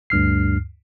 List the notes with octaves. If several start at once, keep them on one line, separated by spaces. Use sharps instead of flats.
D2 G2 F6 C7